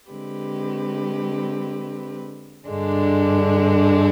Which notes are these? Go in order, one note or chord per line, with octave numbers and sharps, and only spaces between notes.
D3 G#3 C4 G4 B4
G2 D3 G#3 D4